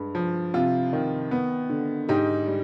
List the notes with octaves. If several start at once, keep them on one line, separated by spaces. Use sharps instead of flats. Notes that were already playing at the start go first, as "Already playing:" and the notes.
Already playing: G2 G#3
F3
C3 F4
D#3
B3
D3
G#2 D#4 G4
G3